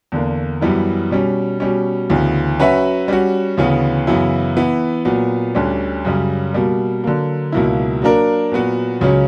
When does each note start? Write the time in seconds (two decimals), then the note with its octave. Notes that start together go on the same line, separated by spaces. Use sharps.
0.12 E2 D3 A#3
0.61 F#2 E3 G3 B3 E4
1.11 B2 G3 C#4
1.60 B2 G3 C#4
2.10 D2 C#3 E3 B3
2.59 F#3 C#4 F#4 B4 E5
3.08 G3 C#4 F#4
3.57 D2 C#3 E3 B3
4.07 F#2 C#3 E3 B3 E4
4.57 E3 B3 E4
5.05 A#2 F#3 B3
5.55 D2 D3 G3 C#4
6.05 F#2 C#3 G3 C#4
6.54 B2 G3 A#3
7.04 D3 F#3 A#3
7.52 C#2 B2 F#3 A#3 E4
8.02 F#3 A#3 D4 A#4
8.51 A#2 F#3 B3 F#4
9.01 C#2 C#3 F#3 C#4